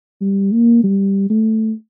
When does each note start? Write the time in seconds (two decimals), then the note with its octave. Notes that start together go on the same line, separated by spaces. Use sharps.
0.21 G3
0.52 A#3
0.84 G3
1.30 A3